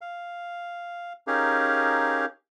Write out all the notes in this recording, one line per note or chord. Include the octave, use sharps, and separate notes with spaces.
F5
C#4 D#4 G4 G#4 A#4 F5